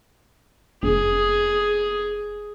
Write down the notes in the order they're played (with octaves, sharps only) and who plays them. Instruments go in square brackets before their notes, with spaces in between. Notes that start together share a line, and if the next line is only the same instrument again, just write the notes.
[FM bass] F1 [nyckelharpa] G#4